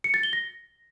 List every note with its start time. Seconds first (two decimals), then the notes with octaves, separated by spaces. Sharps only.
0.04 C#7
0.14 A6
0.23 G7
0.33 A#6